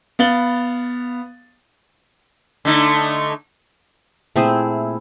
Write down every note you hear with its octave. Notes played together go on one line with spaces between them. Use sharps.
B3 F5 A6 F#7 G7
D3 A3 D#4
A#2 A3 C4 E4 G#4